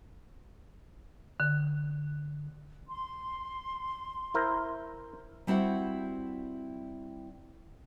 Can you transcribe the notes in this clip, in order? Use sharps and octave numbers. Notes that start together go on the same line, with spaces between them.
D3
C6
E4 A#4 C5
G3 C4 E4 F#4 F#5